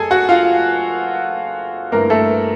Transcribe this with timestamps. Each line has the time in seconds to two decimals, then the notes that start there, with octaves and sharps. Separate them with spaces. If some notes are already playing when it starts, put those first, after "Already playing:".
Already playing: F#1 F#2 G3 G#4 A4 G#5
0.11 F#4 F#5
0.29 F4 F5
1.92 G1 G2 E3 A3 A#3 A#4
2.10 A3 A4